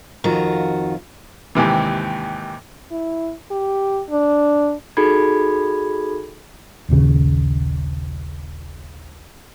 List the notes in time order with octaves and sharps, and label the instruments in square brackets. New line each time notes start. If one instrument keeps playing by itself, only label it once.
[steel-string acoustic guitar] F2 D#3 F4 F#4 A#5
[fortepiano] D#2 G#2 C3 E3
[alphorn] E4
G4
D4
[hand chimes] D#4 F#4 G#4 A4 B5 G#6
[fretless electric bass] D#1 A#1 D#2 C#3